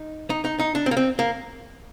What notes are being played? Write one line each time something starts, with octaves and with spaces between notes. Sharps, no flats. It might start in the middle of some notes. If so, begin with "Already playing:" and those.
Already playing: D#4
D#4
D#4
D#4
D4
C4
A#3
C4
A#3